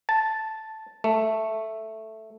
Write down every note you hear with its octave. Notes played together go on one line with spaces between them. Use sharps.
A5
A3